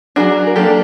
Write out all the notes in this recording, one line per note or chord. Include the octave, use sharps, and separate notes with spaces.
F#3 A#3 D4 F#4 G#4
A#4
F#3 A#3 D4 G4 A4